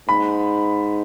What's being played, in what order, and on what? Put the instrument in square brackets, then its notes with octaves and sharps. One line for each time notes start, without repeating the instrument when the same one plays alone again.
[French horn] G#2 [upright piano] B5